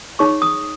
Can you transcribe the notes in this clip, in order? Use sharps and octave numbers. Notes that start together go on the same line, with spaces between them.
D#4 G#4 C#5 C#6
D#6